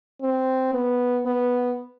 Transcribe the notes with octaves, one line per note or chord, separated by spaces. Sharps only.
C4
B3
B3